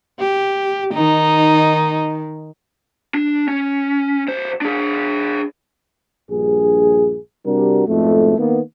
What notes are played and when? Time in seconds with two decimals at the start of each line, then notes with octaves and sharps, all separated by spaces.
0.20 G4
0.94 D#3 D#4
3.14 D4
3.48 C#4
4.28 B1 C5
4.61 D4 G#4
6.31 A#1 G2 G#4
7.45 C3 G3 D4 F#4 A#4
7.87 F2 G#2 B2 A3
8.38 D#3 A#3 B3